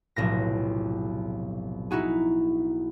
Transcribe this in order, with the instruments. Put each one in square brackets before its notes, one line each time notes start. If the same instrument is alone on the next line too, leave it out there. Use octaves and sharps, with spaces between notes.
[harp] F1 B1 A2 A#6
D#4 E4 F#4 G#4